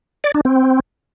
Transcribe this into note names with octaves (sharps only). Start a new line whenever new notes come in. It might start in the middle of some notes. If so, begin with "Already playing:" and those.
D5
D4
C4